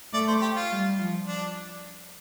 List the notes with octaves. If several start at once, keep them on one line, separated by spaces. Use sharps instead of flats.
A3 D5
C5
G4
F4
G3
F3
D4